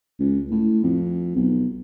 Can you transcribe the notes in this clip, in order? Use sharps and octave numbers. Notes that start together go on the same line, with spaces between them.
C#2
A2
F2
B1